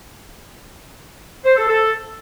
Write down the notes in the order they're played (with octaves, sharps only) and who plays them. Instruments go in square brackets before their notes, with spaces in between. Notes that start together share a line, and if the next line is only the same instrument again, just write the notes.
[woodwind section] C5
A4
A4